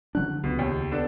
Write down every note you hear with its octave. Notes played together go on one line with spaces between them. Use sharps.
D3 F#3 D4 F#6
C#2 B2
D#2
B3 D4 A4